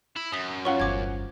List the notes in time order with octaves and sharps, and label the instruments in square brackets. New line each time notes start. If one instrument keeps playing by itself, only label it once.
[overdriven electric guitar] E4
[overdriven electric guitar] F#2 [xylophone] D#6 B6
[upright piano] C#4 F4 F#5 [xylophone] C#6 G7
[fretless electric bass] G1 E2 [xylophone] C5 D6 G#6